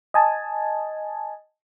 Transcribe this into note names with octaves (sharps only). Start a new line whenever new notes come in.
D#5 G#5 A5